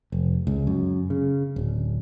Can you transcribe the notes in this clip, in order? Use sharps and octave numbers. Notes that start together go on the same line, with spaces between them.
F1
C#2
F#2
C#3
D1